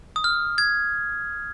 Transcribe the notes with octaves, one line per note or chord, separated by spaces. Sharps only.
D#6
F6
G#6